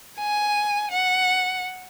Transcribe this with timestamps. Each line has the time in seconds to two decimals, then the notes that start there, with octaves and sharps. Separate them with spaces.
0.18 G#5
0.92 F#5